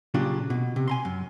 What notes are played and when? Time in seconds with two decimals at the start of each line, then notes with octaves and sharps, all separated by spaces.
0.14 A#2 C#3 F#3 D4 F4 G4
0.50 B2
0.76 C3
0.88 G#5 A#5 C6
1.05 F#2